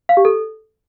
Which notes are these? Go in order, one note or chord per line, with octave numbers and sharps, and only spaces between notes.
F5
G4
A4